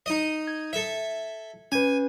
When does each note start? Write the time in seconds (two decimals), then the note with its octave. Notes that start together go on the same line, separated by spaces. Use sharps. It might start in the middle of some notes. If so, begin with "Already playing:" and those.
0.06 D#4 D#5
0.47 G#6
0.73 A4 E5
1.72 C#4 B4 G#5